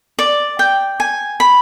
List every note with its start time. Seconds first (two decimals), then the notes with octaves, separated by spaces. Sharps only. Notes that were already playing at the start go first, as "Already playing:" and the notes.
0.19 D5
0.59 G5
1.00 G#5
1.40 B5